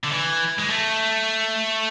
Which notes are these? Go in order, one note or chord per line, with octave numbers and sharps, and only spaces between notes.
D3
E3
G#3
A3